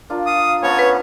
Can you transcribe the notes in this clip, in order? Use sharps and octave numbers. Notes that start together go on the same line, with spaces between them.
D4 F4 A#4
F5 D#6
B3 C#4 C5 C#5 A5
B4